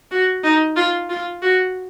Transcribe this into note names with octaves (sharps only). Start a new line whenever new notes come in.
F#4
D#4
F4
F4
F#4